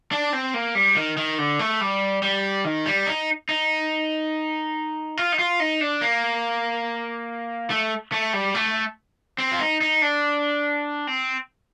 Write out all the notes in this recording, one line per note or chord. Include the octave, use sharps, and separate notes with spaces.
D4
C4
A#3
G3
D#3
D#3
D3
A3
G3
G3
D#3
G3
D#4
D#4
F4
D#4
F4
D#4
D4
A#3
A3
A3
G3
A3
C4
F4
D#4
D#4
D4
C4